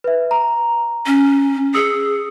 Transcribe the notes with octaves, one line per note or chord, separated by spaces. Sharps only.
B4 E5
A#5
C#4
G#4 D#6 E6 C#7